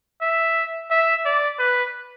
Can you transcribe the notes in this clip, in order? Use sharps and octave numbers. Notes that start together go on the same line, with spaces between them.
E5
E5
D5
B4